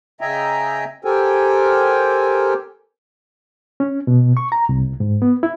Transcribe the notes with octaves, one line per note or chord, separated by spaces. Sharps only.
C#3 D#5 E5 G5 G#5 A#5
G4 A4 A#4 C5 G5 G#5
C#4
B2
C#6
A#5
C2
G#2
B3
E4